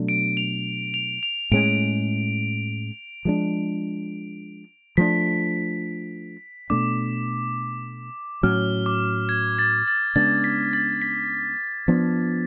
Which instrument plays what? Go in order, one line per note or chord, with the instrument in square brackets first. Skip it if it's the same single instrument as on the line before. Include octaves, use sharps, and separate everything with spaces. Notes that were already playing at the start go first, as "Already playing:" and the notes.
Already playing: [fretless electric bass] B2 F#3 A3 D4
[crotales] D7
F7
F7
F7
[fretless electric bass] A2 G#3 C#4 [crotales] D7
[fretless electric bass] F3 G#3 D4
[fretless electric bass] F3 A3 D4 [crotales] B6
[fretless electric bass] B2 A3 D4 [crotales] D6
[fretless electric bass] A2 F#3 C#4 [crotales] F6
[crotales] D6
G#6
A6
A6
[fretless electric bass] C#3 G#3 B3 D4 [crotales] A6
[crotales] B6
A6
B6
[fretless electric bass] F3 B3 D4